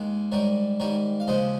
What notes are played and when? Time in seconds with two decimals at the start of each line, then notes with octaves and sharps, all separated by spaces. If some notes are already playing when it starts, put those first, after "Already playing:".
Already playing: D#2 D#3 G#3
0.32 G#2 D#3 G3 A#4 C#5
0.80 G#2 D#3 G3 A#4 C#5
1.20 F5
1.27 D#2 C#3 F3 G#3 C5 D#5